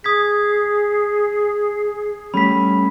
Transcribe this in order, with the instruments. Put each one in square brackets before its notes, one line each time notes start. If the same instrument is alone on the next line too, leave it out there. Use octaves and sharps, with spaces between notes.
[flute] G#4 [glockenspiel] D#6 G#6 B6
[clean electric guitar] G3 A3 C#4 [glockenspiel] B5 B6